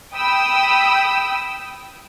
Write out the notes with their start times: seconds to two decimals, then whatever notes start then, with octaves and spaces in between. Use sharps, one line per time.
0.15 G5 B5 D#6 E6